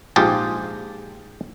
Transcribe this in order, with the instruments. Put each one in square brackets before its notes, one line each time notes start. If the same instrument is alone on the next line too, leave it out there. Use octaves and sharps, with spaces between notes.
[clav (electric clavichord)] A#1 G#2 F4 G4 G#4 A5